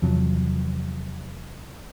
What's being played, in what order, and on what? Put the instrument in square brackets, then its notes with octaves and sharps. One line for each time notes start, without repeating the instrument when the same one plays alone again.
[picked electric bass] E2 C3 F3 F#3